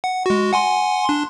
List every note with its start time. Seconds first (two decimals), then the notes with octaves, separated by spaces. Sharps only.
0.04 F#5
0.26 G#3 F#4
0.53 F#5 G#5 C6
1.05 D4 C6